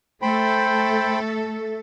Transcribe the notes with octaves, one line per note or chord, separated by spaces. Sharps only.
A3 A4 C5 G5 B5